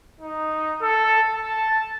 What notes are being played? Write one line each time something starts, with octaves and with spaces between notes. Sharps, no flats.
D#4
A4
A5